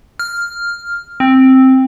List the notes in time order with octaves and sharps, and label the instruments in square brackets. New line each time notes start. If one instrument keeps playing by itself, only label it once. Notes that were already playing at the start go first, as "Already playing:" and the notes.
[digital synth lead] F6
C4